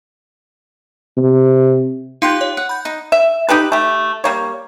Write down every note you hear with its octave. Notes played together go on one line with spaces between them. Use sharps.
C3
D#4 F4 G4 B4 C6 G6
C#5
F#5
B5 G6
D#4
E5
D#4 G4 A4 B4
A3 G4
G3 A#3 C#5